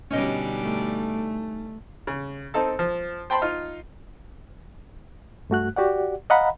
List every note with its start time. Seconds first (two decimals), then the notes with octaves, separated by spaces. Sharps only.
0.10 B2 D3 G3 C#4 D#4 D#5
0.63 A3
2.07 C#3
2.54 C4 D#4 A4 A5
2.79 F3
3.30 C5 G5 A5 B5 C6
3.42 D#4 F4
5.50 G2 A3 F#4 F#6
5.76 F#4 G4 D5 F#5
6.30 D#5 F5 F#5 A#5 B5